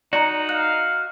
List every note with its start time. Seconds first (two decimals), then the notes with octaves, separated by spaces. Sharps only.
0.13 D#4 F#4 D5 A#5
0.49 F5 F#6